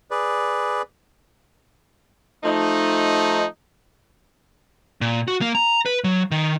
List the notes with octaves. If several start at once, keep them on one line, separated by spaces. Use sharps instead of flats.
G#4 B4 D5
F3 A3 D#4
A#2
F#4
A#3
A#5
B4
F#3
D#3